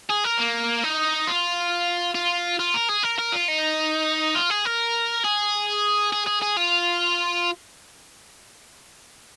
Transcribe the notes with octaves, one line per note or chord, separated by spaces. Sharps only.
G#4
A#4
A#3
D#4
F4
F4
F4
A#4
G#4
A#4
A#4
F4
D#4
F4
G#4
A#4
G#4
G#4
G#4
G#4
F4